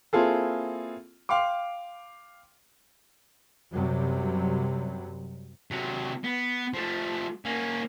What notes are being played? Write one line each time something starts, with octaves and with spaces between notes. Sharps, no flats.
A#3 C4 E4 F4 G#4 A4
F5 G5 C6 D6
F#2 C3 F#3 G3
C3 F#3
B3
F3 A3
A#3 C#4